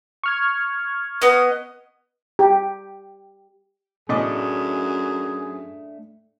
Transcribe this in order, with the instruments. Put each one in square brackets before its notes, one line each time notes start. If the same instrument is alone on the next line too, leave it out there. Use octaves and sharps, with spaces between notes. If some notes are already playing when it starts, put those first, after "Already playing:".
[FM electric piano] C#6 F6 G#6
[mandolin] B3 D#5
[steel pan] G4
[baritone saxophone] F#2 [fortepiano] A2 D#5 D6 [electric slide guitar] A3 D4 [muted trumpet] G#4